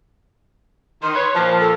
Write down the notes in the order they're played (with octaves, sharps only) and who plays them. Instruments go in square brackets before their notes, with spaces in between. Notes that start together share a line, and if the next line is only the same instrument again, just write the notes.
[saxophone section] D#3 [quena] C6
[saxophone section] B4 C#5
[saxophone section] A#2 F3 [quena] A5
[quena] A4